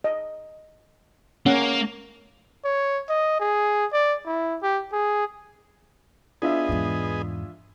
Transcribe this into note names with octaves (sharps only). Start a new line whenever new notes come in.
D#5
A#3 C#4 F#5
C#5
D#5
G#4
D5
E4
G4
G#4
B3 D4 F4 G#4 D#5 E5
E2 G#2